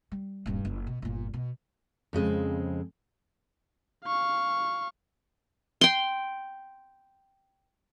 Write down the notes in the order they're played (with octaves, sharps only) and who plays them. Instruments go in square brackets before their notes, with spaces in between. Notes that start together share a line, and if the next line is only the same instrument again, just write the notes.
[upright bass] G3
D#1 G2
F#1
B2
G1 A#2
B2
[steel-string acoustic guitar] F2 C#3 G#3 C4
[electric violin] F5 C#6
[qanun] G5 C6